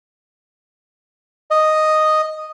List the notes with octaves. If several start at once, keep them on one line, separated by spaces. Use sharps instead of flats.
D#5